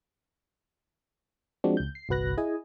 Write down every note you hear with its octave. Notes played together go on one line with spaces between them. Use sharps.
F3 G#3 C4 D4 F#4
C#2 G6
C7
G1 C2 F#4 B4 F#6 A#6
E4 G#4 D#5 G#5